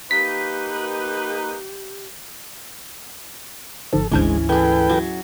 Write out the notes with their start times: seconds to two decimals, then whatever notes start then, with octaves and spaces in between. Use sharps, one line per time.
0.11 A#3 D#4 G4 B4 B6
3.93 G1 G#2 F3 A4
4.12 G1 D2 G#2 E3 G#3 C#4 D4 C5
4.49 E3 G#4 A4 B4 G5
4.90 F#3